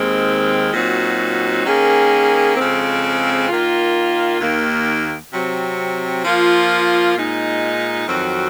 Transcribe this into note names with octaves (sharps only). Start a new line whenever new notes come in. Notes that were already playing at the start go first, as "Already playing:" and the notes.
Already playing: D#2 D#3 G#3 C4
A#2 F#3 C4 D#4 F#4
D#3 A#3 C#4 G#4
F2 C#3 G#3 C4
D#3 A#3 F4
D#2 D#3 A#3
C3 F#3 C4
F3 A#3 F4
A#2 G#3 D#4
F2 D#3 F#3 C4 F#4